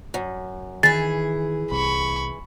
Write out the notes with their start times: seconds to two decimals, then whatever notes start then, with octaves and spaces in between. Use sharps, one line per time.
0.14 F#2
0.83 D#3 E3 G#4 A6
1.72 C2 B5 C#6